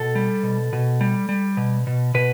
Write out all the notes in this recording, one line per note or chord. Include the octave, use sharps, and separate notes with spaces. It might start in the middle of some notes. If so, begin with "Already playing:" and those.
Already playing: B2 A4
G3
B2
B2
G3
G3
B2
B2
B2 B4